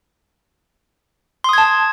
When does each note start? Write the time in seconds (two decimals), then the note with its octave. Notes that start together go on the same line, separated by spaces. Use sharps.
1.44 C6
1.49 D#6
1.53 G#6
1.58 A5